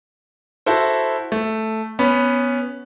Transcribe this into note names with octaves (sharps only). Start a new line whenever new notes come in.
E4 F#4 A4 C5
A3
B3 C#4 B5